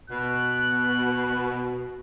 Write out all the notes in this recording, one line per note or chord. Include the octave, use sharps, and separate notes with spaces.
B2 F#6